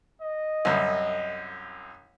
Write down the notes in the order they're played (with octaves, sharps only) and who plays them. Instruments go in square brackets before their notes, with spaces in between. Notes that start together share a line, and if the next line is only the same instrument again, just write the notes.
[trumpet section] D#5
[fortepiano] C2 F#2